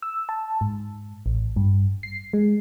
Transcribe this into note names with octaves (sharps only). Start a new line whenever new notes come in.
E6
A5
G#2
A1
G2
C7
G#3